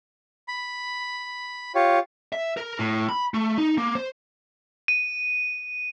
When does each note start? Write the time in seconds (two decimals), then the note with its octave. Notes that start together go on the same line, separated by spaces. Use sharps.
0.48 B5
1.75 F4 G4 C#5
2.32 E5
2.57 A#4
2.79 A2
3.09 B5
3.34 A3
3.58 D#4
3.78 A#3
3.95 C5
4.88 D#7